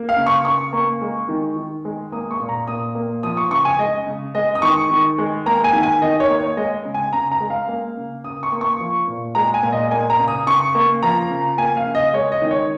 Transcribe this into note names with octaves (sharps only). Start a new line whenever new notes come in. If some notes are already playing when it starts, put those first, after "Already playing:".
Already playing: A#3
F5
C#3
C#6
C#3 C#6
A#3
G#3
D#3
D#3
G#3
A#3 D#6
C#6
A#2
A#5
A#2 D#6
A#3
F3 D#6
C#6
C#3 C#6
G#5
G#3 D#5
C#3
G#3 D#5
D#6
D#3 C#6
D#3
G#3
A#3 A#5
G#5
D#3
G#5
D#3 D#5
C#5
A#3
C#5
G#3 D#5
C#3
G#5
C#3 A#5
A#5
G#3
F5
A#3
C#3
C#3 D#6
C#6
A#3
C#6
F3
A#2
G#3 A#5
G#5
A#2
D#5
A#3 G#5
A#5
C#3
D#6
C#3 C#6
A#3
F3 A#5
C#3
A#3 G#5
F5
C#3
D#5
G#3 C#5
D#5
D#3
C#5